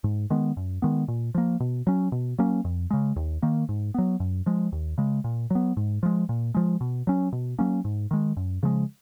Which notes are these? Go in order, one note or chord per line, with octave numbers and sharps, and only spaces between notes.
G#2
D#3 G#3 B3
F#2
D#3 G#3 B3
A#2
F3 A#3
B2
F#3 C#4
B2
F#3 A#3 C#4
F2
C#3 G#3
D#2
D#3 A#3
G#2
F#3 B3
F#2
F3 G#3
D#2
C#3 G#3
A#2
F#3 B3
G#2
F3 G#3
A#2
F3 G#3
B2
F#3 C#4
B2
F#3 A#3 C#4
G#2
D#3 G#3
F#2
C#3 F3 G#3